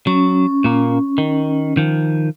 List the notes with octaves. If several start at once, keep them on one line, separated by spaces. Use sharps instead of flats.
F#3 C#4
A#2 A#3
D#3
D#3 F3